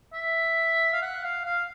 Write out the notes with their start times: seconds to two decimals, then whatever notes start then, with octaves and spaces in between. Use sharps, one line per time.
0.13 E5
0.93 F5
1.02 F#5
1.24 F5
1.45 F5